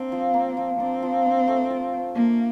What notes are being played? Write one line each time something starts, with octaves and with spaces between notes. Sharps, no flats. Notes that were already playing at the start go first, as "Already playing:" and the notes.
Already playing: A#3 C4 D4
F3
A#3
F3
C4 D4
F3
D4
A3
F4
C5
A#3 D4